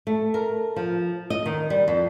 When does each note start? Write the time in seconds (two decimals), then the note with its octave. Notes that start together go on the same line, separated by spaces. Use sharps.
0.07 A3
0.34 A#4
0.76 F3
1.30 D#5
1.46 D#3
1.70 G3
1.88 F2